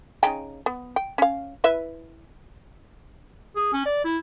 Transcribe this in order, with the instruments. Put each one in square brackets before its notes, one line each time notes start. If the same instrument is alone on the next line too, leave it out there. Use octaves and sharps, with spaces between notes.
[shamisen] C#3 D#4 G5
B3
G5
C#4 F5
E4 B4 E5
[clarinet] G#4
C#4
D5
E4